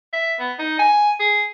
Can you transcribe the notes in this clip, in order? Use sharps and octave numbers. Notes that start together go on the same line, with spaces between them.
E5
B3
D#4
G#5
G#4